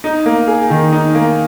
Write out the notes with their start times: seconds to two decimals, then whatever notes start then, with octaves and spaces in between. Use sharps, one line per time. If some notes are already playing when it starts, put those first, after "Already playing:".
0.04 D#4
0.26 A#3
0.47 G#4
0.70 D#3
0.92 D#4
1.15 A#3